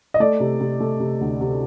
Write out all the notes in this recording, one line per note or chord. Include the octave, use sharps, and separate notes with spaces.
D#5
A3 D5
C3
C3
A3
C3
D2
C3